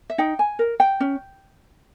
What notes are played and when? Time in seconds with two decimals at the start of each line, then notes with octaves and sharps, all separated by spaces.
0.10 E5
0.18 D#4 G5
0.39 G#5
0.59 A#4
0.80 G5
1.00 C#4